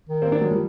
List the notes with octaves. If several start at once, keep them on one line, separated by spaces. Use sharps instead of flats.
D#3
A#3 C4
C4 D4
F#3 G#3
F3 G3